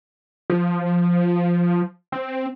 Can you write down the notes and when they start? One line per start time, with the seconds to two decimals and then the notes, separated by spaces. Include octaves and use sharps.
0.50 F3
2.12 C4